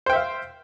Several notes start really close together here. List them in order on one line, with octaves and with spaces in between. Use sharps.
C5 G5 E5 F5